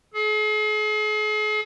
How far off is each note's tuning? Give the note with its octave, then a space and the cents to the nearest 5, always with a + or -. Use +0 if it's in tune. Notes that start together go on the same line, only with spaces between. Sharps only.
G#4 +45